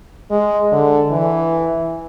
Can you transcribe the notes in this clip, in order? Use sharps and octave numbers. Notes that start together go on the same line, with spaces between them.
G#3
D3
E3